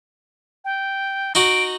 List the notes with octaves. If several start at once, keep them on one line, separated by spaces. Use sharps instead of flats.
G5
D#4 F#4 D7